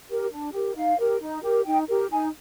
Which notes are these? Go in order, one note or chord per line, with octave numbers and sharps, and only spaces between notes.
G4 A#4
D4
G4 A#4
D#4 F5
G4 A#4
D#4
G4 A#4
D#4 G5
G4 A#4
D#4 G#5